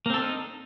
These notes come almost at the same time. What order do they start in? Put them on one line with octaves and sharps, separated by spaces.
A#3 C4 A4 D4 D#4